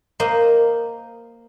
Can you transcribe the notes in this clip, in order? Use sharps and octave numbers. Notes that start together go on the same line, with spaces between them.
A#3 C5 D#5